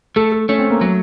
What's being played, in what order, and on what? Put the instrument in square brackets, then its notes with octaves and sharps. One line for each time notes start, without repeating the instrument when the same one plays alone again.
[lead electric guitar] A3 [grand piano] A4
[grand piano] A4
[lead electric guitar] A3 [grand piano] C#4
[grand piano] C4
A#3
[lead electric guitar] F#3 [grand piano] A3